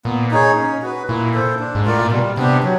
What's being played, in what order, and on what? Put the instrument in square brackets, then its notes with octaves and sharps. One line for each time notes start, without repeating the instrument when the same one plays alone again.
[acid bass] A#2 [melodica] B3
[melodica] D#4 G#4 C#5
C#4
F#4 B4
[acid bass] A#2 [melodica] E4
[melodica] A4 C5
D4
[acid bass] G#2
[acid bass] A2 [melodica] F4 A#4 D5
[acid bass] A#2
[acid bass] B2 [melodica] G3
[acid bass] C3 [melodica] B3 D4 G4
[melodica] F#3